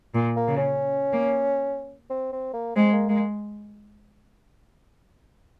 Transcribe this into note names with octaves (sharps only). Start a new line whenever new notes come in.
A#2
A#3
C#3
C#4
A#3
C4
C4
A#3
G#3 C4
A#3
G#3 A#3